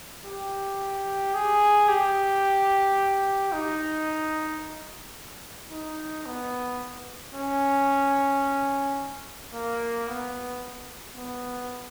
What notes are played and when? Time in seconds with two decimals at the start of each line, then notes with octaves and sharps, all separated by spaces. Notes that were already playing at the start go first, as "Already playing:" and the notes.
0.25 G4
1.34 G#4
1.88 G4
3.52 D#4
5.71 D#4
6.26 B3
7.35 C#4
9.54 A#3
10.08 B3
11.17 B3